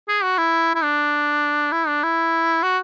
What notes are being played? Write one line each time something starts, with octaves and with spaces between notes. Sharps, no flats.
G#4
F#4
E4
E4
D4
E4
D4
E4
F#4